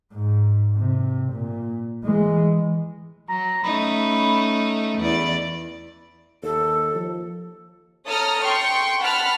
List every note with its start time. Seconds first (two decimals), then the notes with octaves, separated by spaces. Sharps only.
0.13 G#2
0.76 C3
1.32 A#2
2.04 E3 G#3
3.29 F#3 A#5
3.64 A3 C#4 D#4 B5
4.98 E2 D5 B5
6.43 D#2 A4
6.95 F3
8.07 A4 C#5 A#5 D#6 F6
8.43 G5 C6 C#6
9.02 F#5 A5 B5 F6